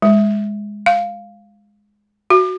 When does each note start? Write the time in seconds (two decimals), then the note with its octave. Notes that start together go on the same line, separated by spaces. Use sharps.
0.02 G#3
0.86 F5
2.30 F#4